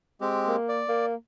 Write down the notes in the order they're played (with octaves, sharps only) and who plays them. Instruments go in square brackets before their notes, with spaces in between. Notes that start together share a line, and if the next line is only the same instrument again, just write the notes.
[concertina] G#3 C4 G4
[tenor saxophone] A#3
[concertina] D5
[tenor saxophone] A#3